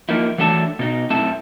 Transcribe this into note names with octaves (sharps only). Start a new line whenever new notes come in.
F3 A#3 D#4 E4
E3 F#3 A3 D4 E5 A5
B2 D#4
F#2 A3 C4 E4 E5 A5